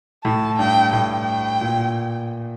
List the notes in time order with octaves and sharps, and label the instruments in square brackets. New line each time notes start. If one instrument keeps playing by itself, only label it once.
[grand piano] A2 [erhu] A5
[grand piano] G2 [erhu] G5
[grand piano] A2 [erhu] G5
[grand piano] A#2